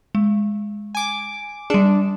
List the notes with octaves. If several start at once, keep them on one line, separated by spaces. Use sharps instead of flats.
G#3
G#5 D6
G3 D4 G#4